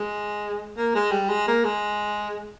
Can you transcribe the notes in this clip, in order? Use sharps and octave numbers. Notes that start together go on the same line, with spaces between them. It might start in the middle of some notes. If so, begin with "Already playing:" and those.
Already playing: G#3
A#3
G#3
G3
G#3
A#3
G#3